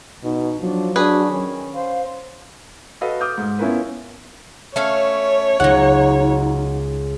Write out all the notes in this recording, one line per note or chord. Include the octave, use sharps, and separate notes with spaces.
B2 D#4
F3 F#3 D4
D4 F#4 G#4 B4
D#3 C#4
C5 F5
F#4 A4 B4 D#5 F5
D6 D#6 F6 G6
G#2
B3 C#4 E4 F4 A#4 B4
A3 C#4 C#5 F5
C#2 F#3 D#4 F#5